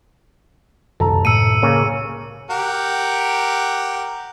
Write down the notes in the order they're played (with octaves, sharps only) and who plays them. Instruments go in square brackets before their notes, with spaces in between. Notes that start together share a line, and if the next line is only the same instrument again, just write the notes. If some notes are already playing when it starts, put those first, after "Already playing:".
[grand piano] D#1 C2 A#5 [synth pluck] F#2 [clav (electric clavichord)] A4
[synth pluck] A2 [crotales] E6 C#7 D#7
[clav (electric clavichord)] C#3 A#3 C#4
[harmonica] G4 A#4 F#5